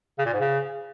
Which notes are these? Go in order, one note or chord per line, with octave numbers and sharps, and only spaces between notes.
C#3
A#2
G#2
C#3